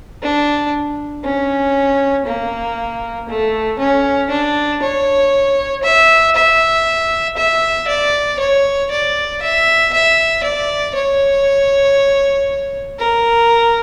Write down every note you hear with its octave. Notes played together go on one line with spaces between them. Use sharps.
D4
C#4
A#3
A3
C#4
D4
C#5
E5
E5
E5
D5
C#5
D5
E5
E5
D5
C#5
A#4